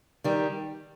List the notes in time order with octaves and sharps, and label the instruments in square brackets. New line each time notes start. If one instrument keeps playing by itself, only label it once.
[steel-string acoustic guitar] D#3 G3